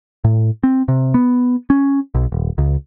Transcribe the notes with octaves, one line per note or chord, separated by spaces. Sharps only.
A2
C4
C3
B3
C#4
B1
D#1
C#2